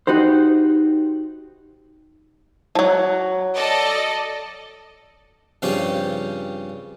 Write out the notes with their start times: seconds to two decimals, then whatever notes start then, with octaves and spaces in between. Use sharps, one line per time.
0.07 D#4 F#4 G4 C5
2.75 F3 F#3
3.55 A4 D5 D#5
5.62 G2 C#3 F3 C4 C#4 G4